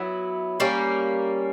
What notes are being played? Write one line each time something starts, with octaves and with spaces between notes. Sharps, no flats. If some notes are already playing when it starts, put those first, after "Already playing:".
Already playing: F#3 B3 E4
G3 A#3 C#4